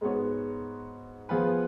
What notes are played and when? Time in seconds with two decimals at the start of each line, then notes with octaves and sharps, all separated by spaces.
0.01 G#2 G#3 B3 F#4 C#5
1.29 F3 B3 F4 G#4 B4